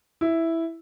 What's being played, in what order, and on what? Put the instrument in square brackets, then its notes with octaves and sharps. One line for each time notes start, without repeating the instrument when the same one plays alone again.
[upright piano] E4